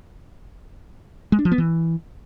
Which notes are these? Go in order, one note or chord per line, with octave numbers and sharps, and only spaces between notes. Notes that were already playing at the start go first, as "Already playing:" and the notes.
G#3
D4
F3
B3
E3